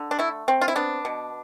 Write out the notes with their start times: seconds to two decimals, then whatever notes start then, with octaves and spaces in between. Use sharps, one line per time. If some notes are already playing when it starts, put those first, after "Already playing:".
Already playing: D3
0.11 D4
0.19 A3 E4
0.48 C4
0.61 F4
0.68 E4
0.76 B3 D4
1.05 B2